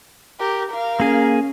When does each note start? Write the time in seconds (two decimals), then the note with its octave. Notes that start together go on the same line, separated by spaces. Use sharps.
0.39 G4 A#4
0.69 A#4 F5
1.00 A#3 C#4 G#4